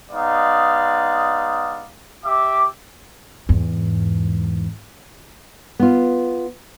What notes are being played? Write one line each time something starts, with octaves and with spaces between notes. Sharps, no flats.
G#3 B3 D#4 D5 F5
G4 E5 D6
E2 G#2
B3 F4